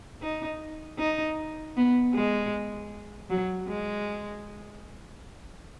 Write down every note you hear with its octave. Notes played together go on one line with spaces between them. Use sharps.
D#4
D#4
B3
G#3
F#3
G#3